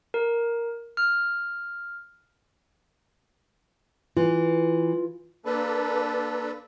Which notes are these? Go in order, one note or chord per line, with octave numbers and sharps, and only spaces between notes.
A#4
F6
E3 F4
A#3 D4 A4 B4